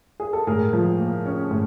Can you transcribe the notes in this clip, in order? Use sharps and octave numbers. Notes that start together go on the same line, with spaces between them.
G#4
A4
A2 G#4 A#4
F3
A#3
C#4
A2